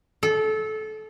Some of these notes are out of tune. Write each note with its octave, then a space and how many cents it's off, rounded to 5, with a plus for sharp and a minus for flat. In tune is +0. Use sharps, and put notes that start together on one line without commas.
A4 -25